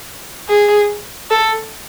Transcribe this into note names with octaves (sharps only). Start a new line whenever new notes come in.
G#4
A4